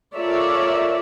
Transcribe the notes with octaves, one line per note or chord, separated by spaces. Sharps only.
F4 A4 A#4 C#5 D5 E5